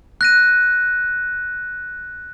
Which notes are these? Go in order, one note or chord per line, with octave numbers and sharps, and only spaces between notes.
F#6 A#6 D#7